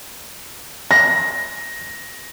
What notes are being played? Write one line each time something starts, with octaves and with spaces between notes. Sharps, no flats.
A#6